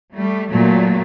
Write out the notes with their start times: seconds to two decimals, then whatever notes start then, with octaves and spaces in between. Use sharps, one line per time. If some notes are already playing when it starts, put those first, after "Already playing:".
0.16 G3 A3
0.52 A#2 F#3 A3